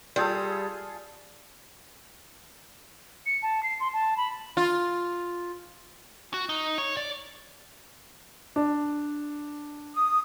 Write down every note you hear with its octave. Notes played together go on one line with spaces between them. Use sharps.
G3 F4 G#4 A4
C#7
A5
C7
C6
A5
B5
F4
F#4
D#4
C#5
D5
D4
D#6